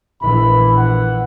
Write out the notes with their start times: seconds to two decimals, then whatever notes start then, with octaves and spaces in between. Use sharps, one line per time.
0.21 A#1 E3 B5
0.78 F#5